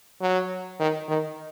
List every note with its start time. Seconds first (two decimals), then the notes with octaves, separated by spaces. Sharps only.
0.21 F#3
0.80 D#3
1.08 D#3